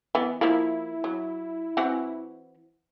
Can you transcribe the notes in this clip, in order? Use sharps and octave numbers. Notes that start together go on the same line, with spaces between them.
E3 B3
F3 A#3 E4
F#3
E3 C4 F#4